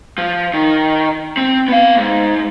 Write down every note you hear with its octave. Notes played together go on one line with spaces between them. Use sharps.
F3
D#3
C4
B3 F5
G#2